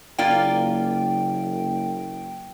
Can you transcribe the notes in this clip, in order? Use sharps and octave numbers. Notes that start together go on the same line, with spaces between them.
F#1 A#3 F4 D5 G5